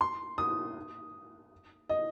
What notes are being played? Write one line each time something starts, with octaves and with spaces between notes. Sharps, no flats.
C6
D#6
D#5